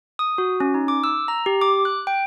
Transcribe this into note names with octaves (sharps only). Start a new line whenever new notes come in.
D#6
F#4
C#4
D#4
D6
E6
A#5
G4
D6
F#6
G5